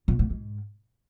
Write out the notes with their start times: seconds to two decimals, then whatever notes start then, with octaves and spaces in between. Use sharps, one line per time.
0.08 A#2
0.19 A2
0.30 G#2